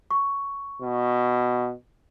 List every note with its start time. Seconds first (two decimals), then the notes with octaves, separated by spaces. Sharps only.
0.11 C#6
0.82 B2